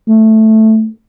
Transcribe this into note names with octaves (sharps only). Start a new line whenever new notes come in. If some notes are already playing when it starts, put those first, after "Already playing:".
A3